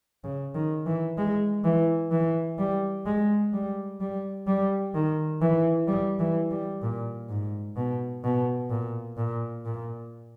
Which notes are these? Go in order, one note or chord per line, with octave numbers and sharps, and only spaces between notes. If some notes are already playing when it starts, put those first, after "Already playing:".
C#3
D#3
E3
G#3
E3
E3
G3
G#3
G3
G3
G3
D#3
E3
G3
E3
G3
A#2
G#2
B2
B2
A#2
A#2
A#2